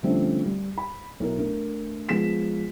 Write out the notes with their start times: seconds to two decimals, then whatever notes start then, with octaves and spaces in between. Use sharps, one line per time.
0.03 D3 F3 G3 A3 C4 C#4
0.44 G3
0.78 B5
1.20 B1 E4 A#4
1.38 A3 D4 A#4
2.09 F3 G#3 B3 G#4 B6 E7